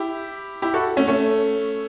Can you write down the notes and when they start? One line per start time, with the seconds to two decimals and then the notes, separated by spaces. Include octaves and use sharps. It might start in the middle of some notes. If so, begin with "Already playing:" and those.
Already playing: E4 G4
0.62 E4 G4
0.74 F#4 A4
0.97 A3 C#4
1.07 A3 C#4